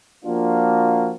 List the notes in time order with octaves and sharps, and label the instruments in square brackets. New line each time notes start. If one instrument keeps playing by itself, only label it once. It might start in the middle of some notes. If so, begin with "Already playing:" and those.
[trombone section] F3 A#3 D4 F4 F#4